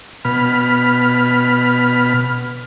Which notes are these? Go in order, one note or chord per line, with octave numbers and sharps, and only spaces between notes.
B2 B5 F6